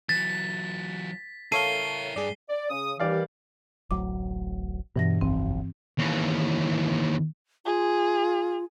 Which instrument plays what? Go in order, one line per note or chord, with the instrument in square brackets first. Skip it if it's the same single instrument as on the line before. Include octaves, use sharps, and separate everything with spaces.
[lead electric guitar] E3 F#3 [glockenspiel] A6 [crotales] B6
[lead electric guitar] E4 A#4 [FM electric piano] A4 C#5 F5 [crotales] C7 G7 [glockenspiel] D#7
[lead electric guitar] G2 [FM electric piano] G#4 D5
[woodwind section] D5
C#3 D#6
[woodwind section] D#2 E3 [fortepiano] G3 D5 F5
[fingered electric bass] D1 A1 F#3 [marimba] D6
[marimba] G2 E3 A#6 [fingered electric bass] B2 D4
[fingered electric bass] F#1 B1 F2 [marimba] C4
[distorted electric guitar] D#2 E3
[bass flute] F4 [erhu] G#4